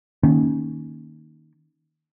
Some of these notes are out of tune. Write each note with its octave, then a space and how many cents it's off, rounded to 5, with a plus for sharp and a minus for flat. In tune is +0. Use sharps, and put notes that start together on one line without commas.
D#3 -5 A#3 +0 C#4 +0